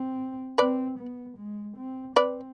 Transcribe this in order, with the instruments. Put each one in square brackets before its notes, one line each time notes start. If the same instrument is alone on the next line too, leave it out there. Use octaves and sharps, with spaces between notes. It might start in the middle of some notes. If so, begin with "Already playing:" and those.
Already playing: [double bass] C4
[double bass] C4 [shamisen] B4 D5
[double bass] B3
G#3
C4
[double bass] C4 [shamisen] B4 D5